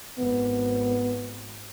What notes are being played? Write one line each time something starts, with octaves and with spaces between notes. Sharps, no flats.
G#1 B3